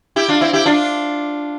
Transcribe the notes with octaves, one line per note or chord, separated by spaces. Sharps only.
E4 G4
D4 F4
C4 E4
E4 G4
D4 F4